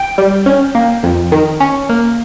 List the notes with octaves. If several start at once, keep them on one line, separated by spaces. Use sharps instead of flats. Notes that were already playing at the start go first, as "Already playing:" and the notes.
Already playing: G5
G3
C#4
A#3
F2
D#3
C#4
A#3